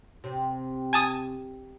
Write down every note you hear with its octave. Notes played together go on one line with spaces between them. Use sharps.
C3
G#5 A5 D#6